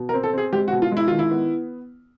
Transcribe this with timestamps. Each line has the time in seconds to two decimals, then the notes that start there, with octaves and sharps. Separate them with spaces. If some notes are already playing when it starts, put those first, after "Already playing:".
Already playing: B2
0.09 A#4
0.14 C4
0.23 A4
0.33 C4 G#4
0.52 G#3 G4
0.68 F#4
0.72 B2
0.82 F4
0.92 G#3
0.97 E4
1.08 D#3 F4
1.19 E4
1.31 B3